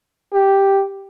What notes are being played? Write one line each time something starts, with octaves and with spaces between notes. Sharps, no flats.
G4